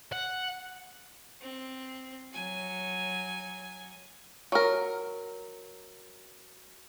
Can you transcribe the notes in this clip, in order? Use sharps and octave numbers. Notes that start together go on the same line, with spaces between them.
F#5
C4
F#3 G#5
F#3 A#4